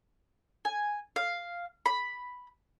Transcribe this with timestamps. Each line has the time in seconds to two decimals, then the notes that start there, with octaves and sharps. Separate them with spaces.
0.65 G#5
1.16 F5
1.86 B5